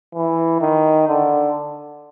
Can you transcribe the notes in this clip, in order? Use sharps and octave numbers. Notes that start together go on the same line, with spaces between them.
E3
D#3
D3